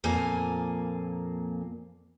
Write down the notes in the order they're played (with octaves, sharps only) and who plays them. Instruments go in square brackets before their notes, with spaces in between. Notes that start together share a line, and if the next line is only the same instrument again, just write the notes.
[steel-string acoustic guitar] F2 A#2 A#3 G#5